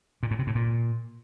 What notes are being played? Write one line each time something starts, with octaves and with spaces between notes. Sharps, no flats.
A#2
A2
C3
A2
A#2